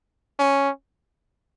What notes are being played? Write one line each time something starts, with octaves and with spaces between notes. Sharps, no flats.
C#4